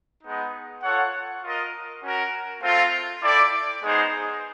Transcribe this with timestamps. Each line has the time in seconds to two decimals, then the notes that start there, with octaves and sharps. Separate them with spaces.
0.22 G#3 B3 D#4
0.82 F4 A4 C#5 F#5
1.42 F4 A#4 D#5
2.02 C#4 F#4 A#4
2.62 A3 C4 F4
3.21 E4 A4 D5 G5
3.81 G#3 B3 D#4 G#4 C5